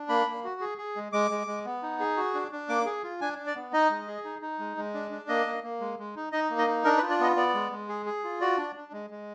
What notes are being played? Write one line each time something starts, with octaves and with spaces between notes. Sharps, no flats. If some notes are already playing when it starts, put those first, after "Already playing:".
Already playing: D4
A#3 B5
A#3
F#4
G#4
G#4
G#3
G#3 D6
G#3
G#3
B3
D#4
G#4
F#4
D4
D4
A#3 D6
G#4
F4
D4 G#5
D4
D5
B3
D#4 D#5
G#3
G#4
D#4
D#4
G#3
G#3
D4
D4
A#3 D#5
A#3
A#3
G#3
G#3
D#4
D#4 D#5
A#3
D#5
D#4
D4 A#4
B4
F4
D5
B3 D#5
B3 D5
G#3
G#3
G#4
G#4
F4
F#4 D5
D4
D4
G#3
G#3